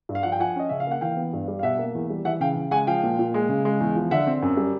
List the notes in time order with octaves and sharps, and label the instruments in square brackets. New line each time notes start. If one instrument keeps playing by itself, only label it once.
[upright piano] G2
F5
F3 F#5
G5
F3 F#5 G#5
C#4 D#5
C#3 E5
F5
A#3 F#5
E3 F5 G5
B3
G2
G3
F5
B2 E5 F#5
A#3
E2
G3
E3 E5 F#5
C#3 F5 G5
C#3
G#3 F#5 G#5
F3 F5 G5
A#2
A#2
G#3
C#3
G#3
E2
F3
D3 E5 F#5
C4
F#2
G3